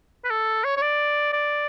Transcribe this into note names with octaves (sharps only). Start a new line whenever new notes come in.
B4
A4
C#5
C#5
D5
D5